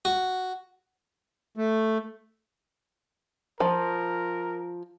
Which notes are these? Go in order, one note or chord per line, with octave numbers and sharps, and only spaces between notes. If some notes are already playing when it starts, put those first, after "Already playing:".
F#4
A3
F3 A#4